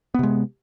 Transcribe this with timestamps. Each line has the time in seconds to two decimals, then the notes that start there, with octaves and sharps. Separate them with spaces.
0.14 B3
0.19 C3
0.23 G#3